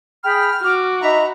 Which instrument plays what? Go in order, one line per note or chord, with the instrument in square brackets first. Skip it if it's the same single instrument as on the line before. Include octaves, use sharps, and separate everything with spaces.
[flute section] G#4 G5 B5 [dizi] F6
[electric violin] F#4 [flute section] D6
[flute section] D#4 E5 B5 [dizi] A#5